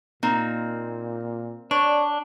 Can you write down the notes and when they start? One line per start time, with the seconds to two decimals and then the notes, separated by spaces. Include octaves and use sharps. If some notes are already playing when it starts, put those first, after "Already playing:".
0.23 A#2 A#3 C4 D#4
1.71 D4 C#5 D5